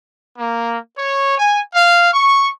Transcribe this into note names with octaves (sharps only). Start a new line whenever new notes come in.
A#3
C#5
G#5
F5
C#6